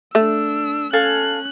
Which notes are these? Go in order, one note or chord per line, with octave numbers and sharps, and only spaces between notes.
A3 D4 E6
C#4 A4 F5 G#5 F#6